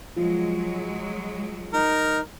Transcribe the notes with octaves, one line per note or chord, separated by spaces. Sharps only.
F3 F#3 G#3
D#4 A#4